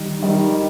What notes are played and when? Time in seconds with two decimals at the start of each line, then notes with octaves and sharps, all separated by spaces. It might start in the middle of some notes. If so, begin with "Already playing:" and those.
Already playing: D#3 G3 D#4
0.23 D#3 G3 D#4